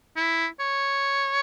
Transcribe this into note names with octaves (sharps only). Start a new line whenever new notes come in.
E4
C#5